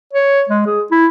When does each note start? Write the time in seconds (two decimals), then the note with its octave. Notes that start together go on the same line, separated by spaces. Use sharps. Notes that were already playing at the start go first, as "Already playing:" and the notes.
0.13 C#5
0.49 G#3
0.66 G#4
0.91 E4